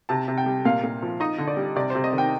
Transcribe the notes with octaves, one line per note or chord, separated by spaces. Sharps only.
C3 A5
C3
G5
G3
A#2 F5
A#2
F3
D#4 D#5
D3
D5
G3
C3 D5
C3 C5
D#5
D#3
G5